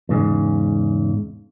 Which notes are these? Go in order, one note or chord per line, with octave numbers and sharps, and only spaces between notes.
E2 G#2 C#3